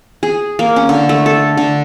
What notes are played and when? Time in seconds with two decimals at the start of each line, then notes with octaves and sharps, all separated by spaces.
0.23 G#4
0.59 A#3
0.76 C#4
0.89 D3
1.09 A3
1.26 A4
1.57 D3